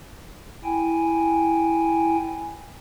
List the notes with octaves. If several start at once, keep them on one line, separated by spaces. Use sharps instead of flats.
E4 G5 G#5